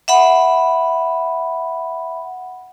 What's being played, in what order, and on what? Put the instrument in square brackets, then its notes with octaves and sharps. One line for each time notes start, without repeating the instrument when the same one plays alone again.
[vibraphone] E5 F#5 B5